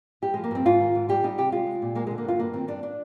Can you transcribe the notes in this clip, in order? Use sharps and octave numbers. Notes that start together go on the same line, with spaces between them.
G2 G4
F3 G#3
A#3
G2 C4
G#2 F4
D#3
G#2
G3 G4
G3 D#4
C3 G4
G#3 F4
G#3
A#2
G#3 A#3
D3 G#3
A#3
G2 F4
G2 A#3
D#3 C4
G2 D4
D4